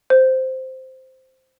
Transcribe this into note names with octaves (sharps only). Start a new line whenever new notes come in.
C5